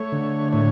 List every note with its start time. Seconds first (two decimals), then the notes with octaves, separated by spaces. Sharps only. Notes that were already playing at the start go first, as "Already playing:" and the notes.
Already playing: A3 C#5
0.12 D3
0.52 A2 C#5